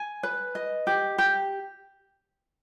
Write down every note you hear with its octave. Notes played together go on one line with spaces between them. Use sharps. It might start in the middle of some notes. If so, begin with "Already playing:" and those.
Already playing: G#5
B4
D#5
G4
G4